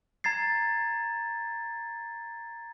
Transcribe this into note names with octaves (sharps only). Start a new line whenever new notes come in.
A#5 G#6 A6 C7